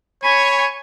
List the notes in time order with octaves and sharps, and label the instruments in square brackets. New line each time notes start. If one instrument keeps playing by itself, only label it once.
[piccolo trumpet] C#5 [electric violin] G#5 C#6 [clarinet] B5